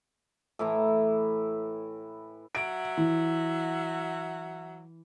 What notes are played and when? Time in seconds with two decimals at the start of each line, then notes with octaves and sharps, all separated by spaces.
0.59 A2 E3 E5 A#5
2.55 F#3 E5 F#5 D7
2.97 E3